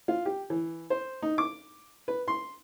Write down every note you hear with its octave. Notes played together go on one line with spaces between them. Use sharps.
F4
G4
E3
C5
D#4
D6
B4
C6